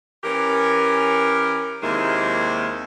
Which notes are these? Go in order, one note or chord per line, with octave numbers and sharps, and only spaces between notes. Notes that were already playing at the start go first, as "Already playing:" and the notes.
E3 C#4 G4 A#4
D#2 C3 D#3 G#3 A#3 E4